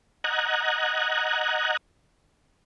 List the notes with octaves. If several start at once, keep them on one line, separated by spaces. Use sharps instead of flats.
D#5 F#5 A#5 F#6 G#6